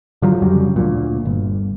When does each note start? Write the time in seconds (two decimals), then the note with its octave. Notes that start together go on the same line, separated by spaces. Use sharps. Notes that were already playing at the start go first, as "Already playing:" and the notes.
0.22 D3 F3 F#3
0.42 F2 C#3 F#3 G3
0.76 D2 A#2
1.25 G1